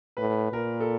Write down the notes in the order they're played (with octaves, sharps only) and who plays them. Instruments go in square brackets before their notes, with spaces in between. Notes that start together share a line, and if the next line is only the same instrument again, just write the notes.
[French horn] A2 [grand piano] B4
[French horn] A#2 [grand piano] A#4
[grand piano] A4